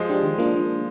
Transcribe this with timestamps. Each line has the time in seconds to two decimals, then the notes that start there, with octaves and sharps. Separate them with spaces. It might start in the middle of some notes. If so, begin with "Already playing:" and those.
Already playing: F3 G#3
0.09 D4 G4
0.23 D#3
0.38 A#3 D4 F4